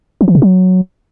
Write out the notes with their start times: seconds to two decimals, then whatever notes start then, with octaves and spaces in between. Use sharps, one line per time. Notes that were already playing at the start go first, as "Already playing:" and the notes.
0.21 F3
0.28 E3
0.35 C3
0.42 F#3